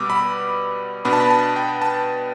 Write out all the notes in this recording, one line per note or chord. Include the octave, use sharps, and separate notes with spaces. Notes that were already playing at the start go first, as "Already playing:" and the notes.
Already playing: B2 G3 B3 D6 E6
B5
B2 B3 D4 B5
A5
B5
A5
G5
A5